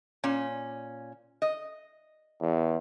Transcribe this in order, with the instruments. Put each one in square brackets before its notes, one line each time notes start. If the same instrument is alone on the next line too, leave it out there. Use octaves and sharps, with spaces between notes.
[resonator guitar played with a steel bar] A#2 C#4
D#5
[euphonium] E2